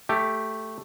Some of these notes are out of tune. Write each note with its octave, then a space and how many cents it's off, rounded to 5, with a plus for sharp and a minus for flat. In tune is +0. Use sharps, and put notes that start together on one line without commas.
A3 +0 G4 +0